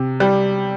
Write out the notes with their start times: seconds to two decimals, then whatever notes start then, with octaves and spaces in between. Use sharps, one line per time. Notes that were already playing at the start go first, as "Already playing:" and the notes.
Already playing: C3
0.20 G3